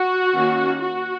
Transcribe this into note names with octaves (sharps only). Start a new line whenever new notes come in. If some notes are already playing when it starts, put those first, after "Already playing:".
Already playing: F#4
D#3 A#3 C#4
F#4